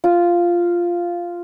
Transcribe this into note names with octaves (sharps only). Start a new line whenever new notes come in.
F4